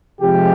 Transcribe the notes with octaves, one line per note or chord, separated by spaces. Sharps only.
C3 F3 G#3 C4 G4